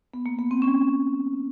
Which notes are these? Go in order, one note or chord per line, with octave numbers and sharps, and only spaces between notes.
B3
A#3
B3
C4
C#4